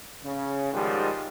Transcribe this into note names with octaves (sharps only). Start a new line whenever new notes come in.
C#3
G#2 D#3 F3 G3